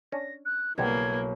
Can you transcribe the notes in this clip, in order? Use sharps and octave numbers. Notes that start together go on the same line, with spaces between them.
C#4 D4 A#6
F#6
B1 E3 F#3 G3 A#3 C4 G#6